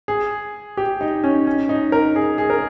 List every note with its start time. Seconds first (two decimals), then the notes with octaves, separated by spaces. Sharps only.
0.08 G#4
0.77 G4
1.01 D#4
1.24 C#4
1.47 C#4
1.69 D#4
1.92 A#4
2.16 G#4
2.38 G#4
2.50 A#4